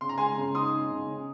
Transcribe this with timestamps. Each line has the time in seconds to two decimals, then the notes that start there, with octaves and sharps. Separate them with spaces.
0.01 C#3 C6
0.09 A#5
0.18 G#3 G#5 C6
0.37 C#3
0.54 D#4 C6 D#6
0.73 C#3
0.91 C#3
1.08 C#4